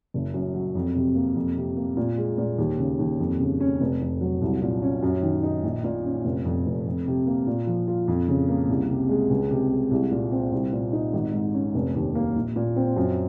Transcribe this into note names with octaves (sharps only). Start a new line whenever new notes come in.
F#1
F#2
F#3
F2
C3
A#3
F2
C3
A#3
A#2
G#3
A#2
D#2
C#3
D#2
F2
C#3
C#4
F1
F2
F#3
C2
A#2
C#4
F#2
D#3
D#4
A#1
A#2
C#4
F1
F2
F1
F2
C3
A#3
A#2
F3
F4
F2
C#3
A#3
C2
C3
G#3
C#2
C3
G#3
C2
A#2
C4
C2
A#2
D#4
G#1
G#2
C#4
F1
D#2
A#3
A#1
A#2
C4
F#2